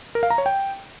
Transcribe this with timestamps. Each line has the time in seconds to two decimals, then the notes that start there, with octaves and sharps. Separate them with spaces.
0.15 A#4
0.23 F5
0.30 A#5
0.38 C#5
0.46 G5